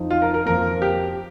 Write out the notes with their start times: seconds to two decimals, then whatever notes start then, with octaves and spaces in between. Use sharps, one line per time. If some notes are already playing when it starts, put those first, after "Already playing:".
Already playing: F2 F3 D#4
0.10 F4
0.22 A#4
0.34 A#4
0.46 F2 F3 A#3 A#4
0.82 G4